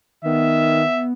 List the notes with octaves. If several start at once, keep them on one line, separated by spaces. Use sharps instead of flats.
D#3 B3 E5